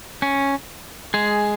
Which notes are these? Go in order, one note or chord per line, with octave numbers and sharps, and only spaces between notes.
C#4
G#3 G#4